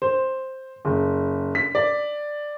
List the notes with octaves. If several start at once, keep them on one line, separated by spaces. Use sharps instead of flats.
C5
F#1
B6
D5